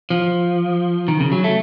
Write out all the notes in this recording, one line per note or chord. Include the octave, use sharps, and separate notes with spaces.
F3
D#3
C#3
F#3
A3